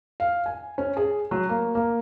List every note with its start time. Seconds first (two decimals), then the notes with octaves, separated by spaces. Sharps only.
0.20 F5
0.46 G#5
0.78 C#4
0.97 G#4
1.31 F#3
1.49 A#3
1.75 A#3